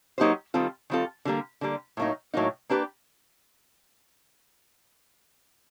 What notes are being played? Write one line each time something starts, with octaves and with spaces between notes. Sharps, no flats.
F#3 A#3 D#4 G4 C5
D#3 G3 C4 F4 A4
D#3 G3 C4 F4 A4
D3 G3 A#3
D3 G3 A#3
A2 F#3 A#3 D#4
A2 F#3 A#3 D#4
A#3 D4 G4 B4